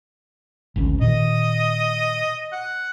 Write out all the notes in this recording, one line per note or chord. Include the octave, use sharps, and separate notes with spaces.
G#1 D2 C#4
A#2 D#3 D#5
F#5